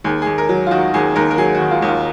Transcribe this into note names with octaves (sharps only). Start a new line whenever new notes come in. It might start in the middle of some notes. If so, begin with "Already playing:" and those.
D#2 G#4
G#4
D#2
A#4
F#3
F4
D#3 F#4
D#2 G#4
D#2 A#4
A#4
F#3 G#4
F#4
D#3
F4
D#2
F4